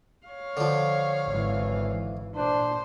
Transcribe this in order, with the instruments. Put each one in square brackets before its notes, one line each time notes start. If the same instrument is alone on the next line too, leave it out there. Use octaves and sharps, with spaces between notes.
[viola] C#5 F5
[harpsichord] D3 F3
[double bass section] G#1 E3
[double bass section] A#2 [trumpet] D4 [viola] C5